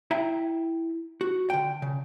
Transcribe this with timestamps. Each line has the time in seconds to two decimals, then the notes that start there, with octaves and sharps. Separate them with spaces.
0.11 E4 E5 G5 A#5
1.21 F#4
1.50 D3 G5
1.82 C#3